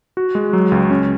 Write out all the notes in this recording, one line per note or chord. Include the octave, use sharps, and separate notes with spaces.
F#4
G#3
F#3
C#2
C#4